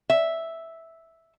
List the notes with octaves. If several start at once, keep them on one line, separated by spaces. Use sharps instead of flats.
E5